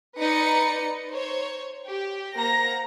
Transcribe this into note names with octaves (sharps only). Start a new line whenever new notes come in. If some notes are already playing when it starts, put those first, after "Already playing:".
D#4 B4 D5 C#7
C5 C#5
G4
A#3 C5 F#5 A#5 A#6